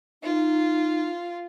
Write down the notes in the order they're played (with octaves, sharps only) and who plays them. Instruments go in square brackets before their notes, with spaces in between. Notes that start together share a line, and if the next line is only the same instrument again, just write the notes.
[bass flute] D#4 [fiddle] F4